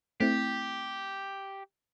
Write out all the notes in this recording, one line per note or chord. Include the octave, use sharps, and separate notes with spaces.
A3 C4 E4 G4